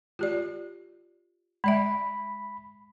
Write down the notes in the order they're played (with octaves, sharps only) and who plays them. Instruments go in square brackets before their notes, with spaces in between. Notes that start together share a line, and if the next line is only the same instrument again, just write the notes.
[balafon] F4 G4 D5
[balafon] G#3 D5 E5 [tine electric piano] B5